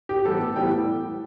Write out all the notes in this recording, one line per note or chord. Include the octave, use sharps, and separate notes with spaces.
G4
A2 E3 G3 B3 A4
A2 E3 G3 B3 G5